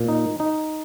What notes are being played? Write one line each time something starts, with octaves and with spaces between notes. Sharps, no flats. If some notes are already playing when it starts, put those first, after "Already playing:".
Already playing: A#2
D#4
D#4